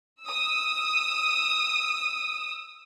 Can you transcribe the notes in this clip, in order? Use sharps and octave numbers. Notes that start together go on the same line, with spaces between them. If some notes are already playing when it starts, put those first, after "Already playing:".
D#6 E6